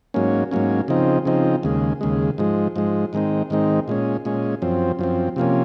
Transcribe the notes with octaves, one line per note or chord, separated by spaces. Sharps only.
G#2 F#3 A#3 C#4
G#2 F#3 A#3 C#4
C#3 F3 C4 D#4
C#3 F3 C4 D#4
D#2 C#3 G#3
D#2 C#3 G#3
G#2 F3 G#3
G#2 F3 G#3
G#2 D#3 G#3 C4 D#4
G#2 D#3 G#3 C4 D#4
A#2 G#3 C#4
A#2 G#3 C#4
F#2 F3 C4
F#2 F3 C4
C3 F3 A#3 C#4